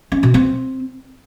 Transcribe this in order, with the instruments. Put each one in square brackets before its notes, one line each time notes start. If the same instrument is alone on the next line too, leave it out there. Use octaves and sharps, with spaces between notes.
[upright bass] C#4
B2
C4